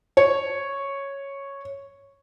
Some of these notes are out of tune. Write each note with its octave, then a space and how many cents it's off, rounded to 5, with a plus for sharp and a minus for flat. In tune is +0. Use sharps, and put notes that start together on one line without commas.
C#5 -5